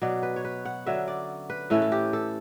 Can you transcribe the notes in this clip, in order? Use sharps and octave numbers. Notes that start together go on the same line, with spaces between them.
B2 F#3 B3 D5
B4
C#5
B4
F#5
D3 F#3 C#4 E5
D5
B4
A2 E3 A3 C#4 A4
A4
G4
A4